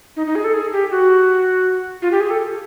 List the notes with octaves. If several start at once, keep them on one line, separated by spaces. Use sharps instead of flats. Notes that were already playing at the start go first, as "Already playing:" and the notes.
D#4
D#4
G#4
A4
G#4
G4
F#4
F4
G4
G#4
A4